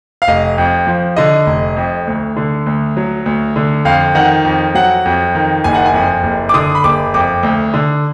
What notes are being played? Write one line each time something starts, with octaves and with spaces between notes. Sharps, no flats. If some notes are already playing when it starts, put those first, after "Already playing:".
F5
F1 D#5
F2
F3
D3 D#5
F1
F2
D2
D3
D2
F#3
D2
D3
F2 F5
D#3 F#5
F2
F#3 F#5
F2
D#3
F#1 G#5
F#5
G#5
F2
F#1
D6
D3 D#6
B5
F#1 D6
F2 D6
D2
D3